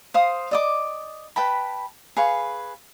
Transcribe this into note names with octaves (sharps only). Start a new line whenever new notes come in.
C5 F5 D#6
D5 D#5 D6
B4 G5 A5 B5
G#4 B4 F5 C#6